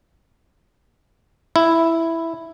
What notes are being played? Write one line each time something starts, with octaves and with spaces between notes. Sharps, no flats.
E4